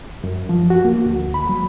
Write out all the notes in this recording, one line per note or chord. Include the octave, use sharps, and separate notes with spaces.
F#2
F3
F#4
A#3
D2
B5
F#3